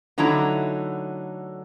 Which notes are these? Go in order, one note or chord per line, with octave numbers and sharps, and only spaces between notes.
D3 F#3 A3 D#4 E4 A#5